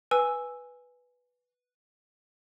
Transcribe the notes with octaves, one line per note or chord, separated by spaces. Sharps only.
B4 G#5 E6